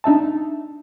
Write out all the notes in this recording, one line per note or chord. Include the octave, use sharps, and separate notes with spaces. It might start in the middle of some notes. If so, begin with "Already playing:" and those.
D4 D#4 E5 A5